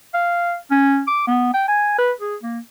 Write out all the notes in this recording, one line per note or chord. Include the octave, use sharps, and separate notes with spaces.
F5
C#4
D6
B3
G5
G#5
B4
G#4
A#3